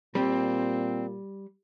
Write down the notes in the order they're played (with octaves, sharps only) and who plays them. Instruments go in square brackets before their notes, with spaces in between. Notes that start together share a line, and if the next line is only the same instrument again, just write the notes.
[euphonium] A#2 [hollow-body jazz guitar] G3 [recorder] C4